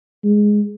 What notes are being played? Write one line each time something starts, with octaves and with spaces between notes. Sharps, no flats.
G#3